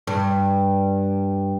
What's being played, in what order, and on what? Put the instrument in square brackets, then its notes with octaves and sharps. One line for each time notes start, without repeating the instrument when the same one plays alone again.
[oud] G2